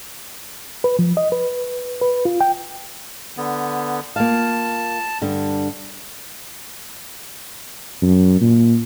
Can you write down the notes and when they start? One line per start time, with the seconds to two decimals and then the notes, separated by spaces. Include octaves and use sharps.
0.84 B4
0.99 F3
1.17 D#5
1.32 B4
2.02 B4
2.25 F4
2.41 G5
3.37 D3 B3
4.16 A#3 F4 F5 A5
5.22 G2 D3
8.02 F#2
8.41 A#2